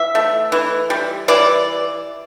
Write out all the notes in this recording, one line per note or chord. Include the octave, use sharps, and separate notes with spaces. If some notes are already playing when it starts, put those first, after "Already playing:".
Already playing: E3 E5
A3
E3
G3
E3 D5